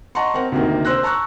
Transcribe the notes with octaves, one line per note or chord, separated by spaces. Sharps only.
D#5 F#5 A5 A#5 C6 C#6
C4 A#4 F#5
D2 C3 D#3 A#3
C5 C6 E6 F#6 A#6
A5 A#5 C#6 E6 F#6